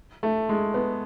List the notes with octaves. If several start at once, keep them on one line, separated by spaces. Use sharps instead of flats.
A3
G#3
B3